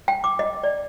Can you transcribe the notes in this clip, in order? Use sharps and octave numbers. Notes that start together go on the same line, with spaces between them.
G5
D6
D#5
D5